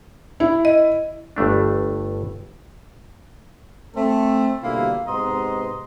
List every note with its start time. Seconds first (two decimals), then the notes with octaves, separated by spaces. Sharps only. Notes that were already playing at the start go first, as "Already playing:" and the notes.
0.40 E4
0.65 D#5
1.36 G1 G2 A3 D4
3.95 A3 C4 A4
4.63 B2 D3 G3 A#3 E4 F4
5.06 G#2 C3 B3 D#5 A#5 C6